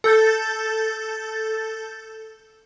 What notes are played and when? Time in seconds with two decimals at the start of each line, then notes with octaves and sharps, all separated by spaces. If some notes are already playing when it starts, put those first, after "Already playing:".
0.04 A4 G6 A6